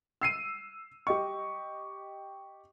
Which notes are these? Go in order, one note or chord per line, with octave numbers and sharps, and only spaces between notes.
E6 C7 D#7
G4 D#5 C#6